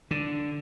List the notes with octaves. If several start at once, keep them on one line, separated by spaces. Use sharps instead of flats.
D3